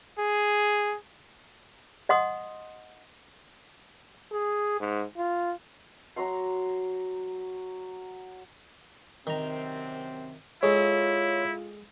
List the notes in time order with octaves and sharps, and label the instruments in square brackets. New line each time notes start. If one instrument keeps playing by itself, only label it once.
[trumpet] G#4
[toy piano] D#5 F#5 C6 D#6
[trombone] G#4
G#2
F4
[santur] F#3 A#5 C6
[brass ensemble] F#2 C3 C4 [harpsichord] D#3 A#5
[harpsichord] G#3 A4 [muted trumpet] E4 [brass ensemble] F4 [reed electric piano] C#5